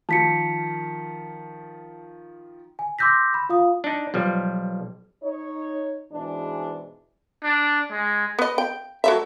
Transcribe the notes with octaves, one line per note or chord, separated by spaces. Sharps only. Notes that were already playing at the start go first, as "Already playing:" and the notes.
D#3 F3 A5 B6 C#7
G#5
C6 D6 E6 G6 A#6 B6
B5
F4 F5 D#6
D4 D#4
B1 F3 G3
D#4 C#5
G#2 B2 E3 D4 G#4
D4
G#3
B3 D#5
G5
F#3 A3 E5